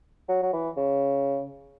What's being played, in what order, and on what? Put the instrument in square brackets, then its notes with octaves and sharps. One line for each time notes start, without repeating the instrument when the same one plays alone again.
[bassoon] F#3
F#3
E3
C#3